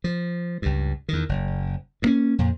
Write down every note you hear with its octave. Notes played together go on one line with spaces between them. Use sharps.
F3
C#2 G2
E2 D#3
F#1
G2 A#3 C#4
F2 A#2